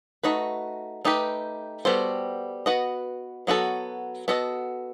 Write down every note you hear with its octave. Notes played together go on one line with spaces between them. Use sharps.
A3 D#4 F#4 B4
A3 D#4 G4 B4
G3 B3 F#4 A4 C5
B3 F#4 B4 D#5
F#3 B3 F#4 A4
B3 F#4 A4 D#5